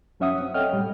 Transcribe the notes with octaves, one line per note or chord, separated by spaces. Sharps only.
F#2 F#3 C#4 E5 F#5 D#6
C4
A4 C#5 D#5 F#5 G5 F6
A2 G3